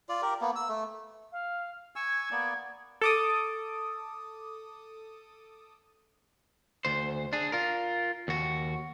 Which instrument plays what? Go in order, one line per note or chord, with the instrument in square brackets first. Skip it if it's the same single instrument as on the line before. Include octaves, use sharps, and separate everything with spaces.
[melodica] F4 D5
G4 A#4
A#3 B3
E6
A3
[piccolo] F5
[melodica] G#5 C#6 E6 [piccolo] G#6
[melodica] A#3 B3 D5
[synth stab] A4 D6 D#6
[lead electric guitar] D2 C5
D4 G#4
F4 A#4
D#2 F#4